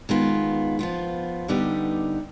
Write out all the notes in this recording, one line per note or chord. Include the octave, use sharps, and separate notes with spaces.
D#3 G#3 B3 F4
F3 B3 F4
D3 G3 B3 D#4 G4